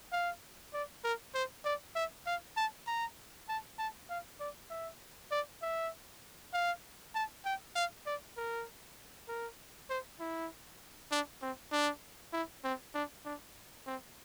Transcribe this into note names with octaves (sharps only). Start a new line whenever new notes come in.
F5
D5
A#4
C5
D5
E5
F5
A5
A#5
A5
A5
F5
D5
E5
D5
E5
F5
A5
G5
F5
D5
A#4
A#4
C5
E4
D4
C4
D4
E4
C4
D4
D4
C4